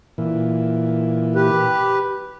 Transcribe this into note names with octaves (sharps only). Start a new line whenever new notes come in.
A#2 E3
G4 B4